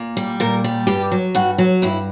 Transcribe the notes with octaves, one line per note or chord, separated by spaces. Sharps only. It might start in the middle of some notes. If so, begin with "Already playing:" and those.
Already playing: A#2
G3
A#2 A#4
G3
G2 G4
F#3
G2 F#4
F#3
G2 E4